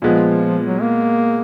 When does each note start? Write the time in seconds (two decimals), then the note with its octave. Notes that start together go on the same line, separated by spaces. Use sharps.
0.02 A#2 F3 G#3 B3
0.66 F#3
0.81 A#3